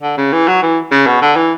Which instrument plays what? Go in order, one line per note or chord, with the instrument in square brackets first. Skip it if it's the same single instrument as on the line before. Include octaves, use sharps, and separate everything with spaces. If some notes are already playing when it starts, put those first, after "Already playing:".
[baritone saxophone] D3
C#3
E3
F#3
E3
C#3
B2
D3
E3